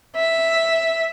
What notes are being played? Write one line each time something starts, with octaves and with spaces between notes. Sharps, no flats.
E5